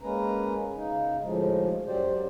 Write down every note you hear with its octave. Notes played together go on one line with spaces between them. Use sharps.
G#3 A#3 C#4 B4 A#5
C#3 D#4
D2 A2 F3 G#3
F#2 F#3 G4 C5 D5